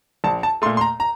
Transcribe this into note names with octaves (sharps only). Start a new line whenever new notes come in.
A#1 A5
A5
A#2 A3 C6
C6
A#5
A#5